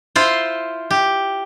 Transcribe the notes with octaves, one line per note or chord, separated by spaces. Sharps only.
E4 F4 C5
G4